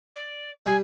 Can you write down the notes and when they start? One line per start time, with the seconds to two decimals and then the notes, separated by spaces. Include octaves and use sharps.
0.15 D5
0.66 G3 G#5